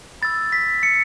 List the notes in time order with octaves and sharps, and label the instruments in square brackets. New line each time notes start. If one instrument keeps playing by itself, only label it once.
[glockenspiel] B5 E6 A6
B6
C#7